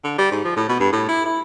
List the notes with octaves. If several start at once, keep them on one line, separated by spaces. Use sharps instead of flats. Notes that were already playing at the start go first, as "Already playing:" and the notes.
D3
G3
G#2
F3
A2
B2
G2
A2
E4
E4